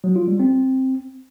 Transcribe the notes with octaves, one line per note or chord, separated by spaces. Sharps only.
F#3
F4
G3
C4